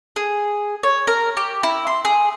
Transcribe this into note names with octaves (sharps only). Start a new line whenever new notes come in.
G#4
C#5
A#4
G4
E4
C6
G#4